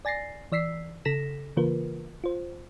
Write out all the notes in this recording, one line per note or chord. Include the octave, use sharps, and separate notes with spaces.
D5 G#5 A6 A#6 C7
E3 D5 E6 B6 C7
C#3 A4 A#6 B6 E7
C#3 E3 A#3 F4 A#4 B4
F4 C5